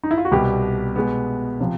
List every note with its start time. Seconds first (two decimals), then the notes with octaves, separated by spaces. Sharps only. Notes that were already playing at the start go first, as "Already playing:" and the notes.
0.04 D#4
0.11 E4
0.17 F4
0.25 F#4
0.31 C2 B2 G3 B3 G4
0.96 B2 G#3 B3
1.60 C3 F3